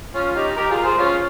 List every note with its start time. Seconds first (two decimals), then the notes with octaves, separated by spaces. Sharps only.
0.14 C#4 F4
0.35 D#4 G4
0.56 G4 A#4
0.70 F4 G#4
0.84 G#4 C5
0.98 C#4 F4